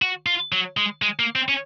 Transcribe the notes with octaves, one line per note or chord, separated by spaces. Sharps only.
F#4
F4
F#3
G#3
G#3
A#3
C4
C#4